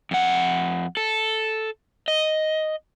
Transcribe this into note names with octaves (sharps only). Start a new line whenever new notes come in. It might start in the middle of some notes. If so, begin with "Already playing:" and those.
F2 F#5
A4
D#5